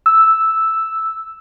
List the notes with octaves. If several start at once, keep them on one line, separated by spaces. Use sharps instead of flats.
E6